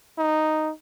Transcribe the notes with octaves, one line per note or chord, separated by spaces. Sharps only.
D#4